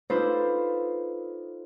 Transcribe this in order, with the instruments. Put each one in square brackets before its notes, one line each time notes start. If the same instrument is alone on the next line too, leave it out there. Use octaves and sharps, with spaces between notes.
[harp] D4 D#4 F4 A4 B4 C5